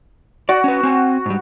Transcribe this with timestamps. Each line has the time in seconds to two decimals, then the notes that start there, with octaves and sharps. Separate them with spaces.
0.49 F#4 D5
0.64 C#4 B4
0.83 C4 G#5
1.26 G#2 G3